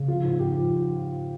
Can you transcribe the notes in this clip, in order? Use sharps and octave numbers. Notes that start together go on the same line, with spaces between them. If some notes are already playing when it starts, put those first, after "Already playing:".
Already playing: C#3
F3 F4
G#2
G#2 G4
F3